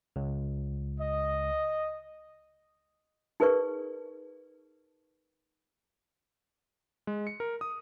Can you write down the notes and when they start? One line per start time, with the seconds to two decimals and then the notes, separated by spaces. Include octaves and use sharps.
0.16 C#2
1.00 D#5
3.40 D#4 G#4 A#4 B4 D5 C#6
7.07 G#3
7.27 C#7
7.40 A#4
7.61 D#6